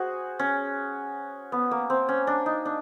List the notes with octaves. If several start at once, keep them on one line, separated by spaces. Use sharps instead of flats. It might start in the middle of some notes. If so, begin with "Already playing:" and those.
Already playing: F#4 G#4 C5
C#4
B3
A#3
C4
C#4
D4
D#4
D4